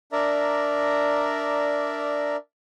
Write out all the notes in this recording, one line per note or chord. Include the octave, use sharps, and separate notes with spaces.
D4 A#4 D5 E5 A#5